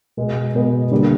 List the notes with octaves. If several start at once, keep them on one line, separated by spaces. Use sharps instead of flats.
B2 G#3 B3
B2 G#3 B3
D3 G3 A#3 D4